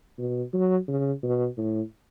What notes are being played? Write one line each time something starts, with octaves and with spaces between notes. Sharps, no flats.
B2
F#3
C#3
B2
A2